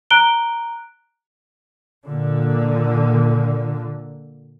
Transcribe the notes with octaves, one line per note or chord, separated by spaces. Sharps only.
A#5 F#6 D7 G7
A#2 D3